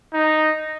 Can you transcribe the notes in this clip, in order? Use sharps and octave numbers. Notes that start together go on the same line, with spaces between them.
D#4